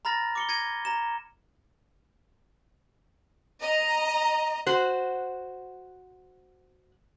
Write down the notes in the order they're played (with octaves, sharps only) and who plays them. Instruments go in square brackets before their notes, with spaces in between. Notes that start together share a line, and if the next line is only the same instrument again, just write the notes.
[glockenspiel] A#5 B5 F6 A6 A#6
D6 C#7 G7
G#6 A#6 C#7 D#7
A#5 E7
[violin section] D#5 A#5
[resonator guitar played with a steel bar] F#4 C5